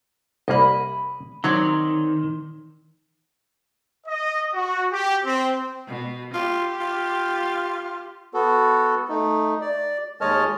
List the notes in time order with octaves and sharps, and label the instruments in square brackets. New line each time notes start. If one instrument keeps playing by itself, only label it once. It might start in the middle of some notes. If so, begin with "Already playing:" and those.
[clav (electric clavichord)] C2 A#3 [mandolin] D#5 B5
[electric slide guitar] D#3 [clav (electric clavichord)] F#3 [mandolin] C4 C#5 D5
[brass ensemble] D#5
F#4
G4
C4
[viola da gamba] B2
[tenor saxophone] F4 [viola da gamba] G4
[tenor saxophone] F4
[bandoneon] B3 F#4 A4
A3 D#4
D5
D#2 G#3 C#5 D#5 A5 F6